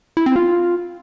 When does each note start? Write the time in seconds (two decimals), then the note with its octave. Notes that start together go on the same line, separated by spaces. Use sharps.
0.17 E4
0.26 C4
0.36 F4